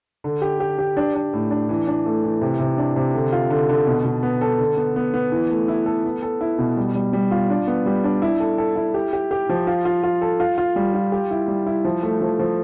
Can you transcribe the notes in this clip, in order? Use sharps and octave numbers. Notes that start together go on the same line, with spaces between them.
D3
G4
G4
G4
D4
D4
A2
D4
E3
D4
A3
E3
C3
C3
D4
C3
D3
F4
D3
D3
B2
B2
B3
A4
D3
B3
B3
B3
E3
A3
E4
A4
B3
A4
E4
B2
G3
G3
G3
F4
D4
B3
G3
D4
E4
A4
A4
E4
G4
G4
G4
F3
F4
F4
F4
A4
F4
F4
G3
F4
G4
E4
G3
E4
F3
A3
F3
F3